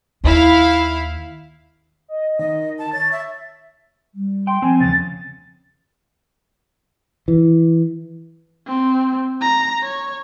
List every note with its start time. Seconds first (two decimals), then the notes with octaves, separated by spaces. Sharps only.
0.24 D#2 E4 F5
2.08 D#5
2.39 D#3 D#5
2.79 A5
2.93 C#5 A6
3.12 E5
4.15 G3
4.47 G5 C6
4.62 F3 C4 G#5
4.80 E2 C#3 A6
7.28 E3
8.66 C4
9.41 A#5
9.83 C#5